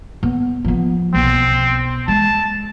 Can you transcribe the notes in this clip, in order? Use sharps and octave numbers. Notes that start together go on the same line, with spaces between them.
B3
F3 B3
B1 B3 C4
G#3 A5